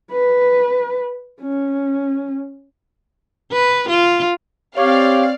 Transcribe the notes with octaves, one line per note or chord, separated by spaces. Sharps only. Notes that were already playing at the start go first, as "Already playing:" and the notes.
B4
C#4
B4
F4
C4 G4 C#5 D5 F5 C#6 G#6